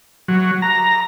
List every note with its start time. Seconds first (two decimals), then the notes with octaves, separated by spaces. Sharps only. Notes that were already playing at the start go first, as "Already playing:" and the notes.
0.28 F#3
0.62 A#5